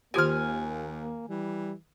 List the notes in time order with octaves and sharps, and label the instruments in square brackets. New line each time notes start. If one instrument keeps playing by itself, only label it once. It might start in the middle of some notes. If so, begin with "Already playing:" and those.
[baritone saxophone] D#2 [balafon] D#3 F4 G4 [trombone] A#3 [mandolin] G#5 F6
[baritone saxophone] E3 [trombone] G3